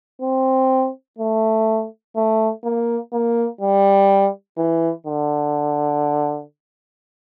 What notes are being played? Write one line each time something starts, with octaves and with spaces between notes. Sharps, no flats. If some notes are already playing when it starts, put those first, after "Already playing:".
C4
A3
A3
A#3
A#3
G3
E3
D3